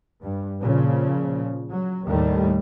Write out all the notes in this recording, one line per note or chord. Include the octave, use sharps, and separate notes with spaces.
G2
A#2 C#3 F3
F#3
D#2 A2 D#3 G3 A3